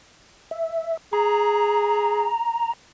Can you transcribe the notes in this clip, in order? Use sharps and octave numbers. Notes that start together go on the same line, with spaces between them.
E5
G#4 A#5